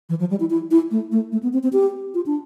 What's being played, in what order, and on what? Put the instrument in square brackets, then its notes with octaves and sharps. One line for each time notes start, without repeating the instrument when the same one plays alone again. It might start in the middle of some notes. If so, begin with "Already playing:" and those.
[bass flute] E3
F3
G3
E4
E4
E4
A3
A3
A3
B3
C4
C4
G4
F4
D4